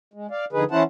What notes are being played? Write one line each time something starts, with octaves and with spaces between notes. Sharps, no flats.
G#3
D5 F5
F2 D3 D#4 G#4 B4
E3 C#4 E4 C5 F#5 A5